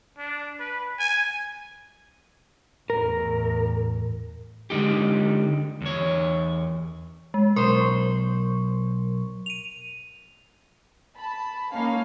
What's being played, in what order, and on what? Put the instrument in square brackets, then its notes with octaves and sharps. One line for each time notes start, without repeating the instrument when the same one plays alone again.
[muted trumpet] D4
B4
G#5
[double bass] E2 A2 [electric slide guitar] A#4
[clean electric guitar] D3 G#3 D#4 G4
E2 C#5
[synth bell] G#3
[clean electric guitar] B1 C5 [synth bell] A#4 C6 C#6
[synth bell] D#7 F7
[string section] A5 B5
A#3 C#4 D#4 F5